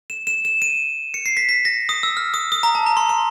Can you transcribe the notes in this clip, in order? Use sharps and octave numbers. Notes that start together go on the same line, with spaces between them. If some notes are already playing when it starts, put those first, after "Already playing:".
E7
E7
E7
D#7
C#7
C7
B6
B6
A#6
D#6
E6
F6
D#6
D#6
A#5
A5
A#5
C6
C6